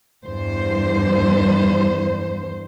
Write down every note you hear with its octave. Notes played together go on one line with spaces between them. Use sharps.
E2 G2 C5